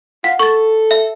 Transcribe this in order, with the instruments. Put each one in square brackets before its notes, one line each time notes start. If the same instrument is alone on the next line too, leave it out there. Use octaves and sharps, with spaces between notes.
[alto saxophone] F4 [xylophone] F#5
[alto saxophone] A4 [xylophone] C#6 A6
[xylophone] E5